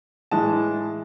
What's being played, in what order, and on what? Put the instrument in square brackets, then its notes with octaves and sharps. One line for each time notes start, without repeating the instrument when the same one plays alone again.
[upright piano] A2 E3 G#3 A5